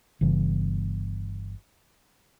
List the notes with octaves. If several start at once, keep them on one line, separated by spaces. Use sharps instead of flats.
G1 C#3 E3